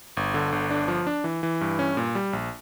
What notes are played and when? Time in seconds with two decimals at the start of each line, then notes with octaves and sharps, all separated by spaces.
0.17 G1
0.34 D3
0.52 G1
0.71 D4
0.88 F3
1.07 D4
1.24 E3
1.43 E3
1.61 G2
1.79 C#4
1.97 A#2
2.15 G3
2.33 A#1